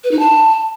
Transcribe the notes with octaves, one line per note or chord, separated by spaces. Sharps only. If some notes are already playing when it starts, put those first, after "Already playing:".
B4
D#4
A5